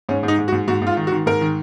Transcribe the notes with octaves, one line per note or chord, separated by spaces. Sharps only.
G#2 C#4
G#2
D#4
G#2
F#4
G#2
G#2 F#4
G#2
F4
D#3
F#4
D#3
G#2 A#4
D#3